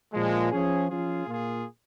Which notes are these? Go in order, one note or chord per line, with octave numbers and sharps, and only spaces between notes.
A#2 F3 G#3
F3 C#4 G#4
F3 C#4 F4 G#4
A#2 A#3 F4 G#4